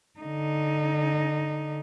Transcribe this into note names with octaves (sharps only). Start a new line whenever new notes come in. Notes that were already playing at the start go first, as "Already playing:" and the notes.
D3 D#4